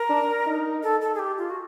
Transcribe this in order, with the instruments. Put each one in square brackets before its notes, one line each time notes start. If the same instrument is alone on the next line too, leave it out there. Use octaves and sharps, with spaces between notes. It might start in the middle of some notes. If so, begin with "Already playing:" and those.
Already playing: [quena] A#4
[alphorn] D4
D#4
[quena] A4
A4
G#4
G4
F4
F#4